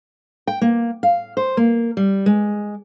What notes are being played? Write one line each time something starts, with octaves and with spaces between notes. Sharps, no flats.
G5
A#3
F5
C5
A#3
G3
G#3